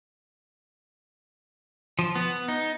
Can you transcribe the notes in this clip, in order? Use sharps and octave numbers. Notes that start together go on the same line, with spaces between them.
F3
B3
D#4